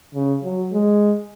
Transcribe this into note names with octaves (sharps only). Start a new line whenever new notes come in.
C#3
F#3
G#3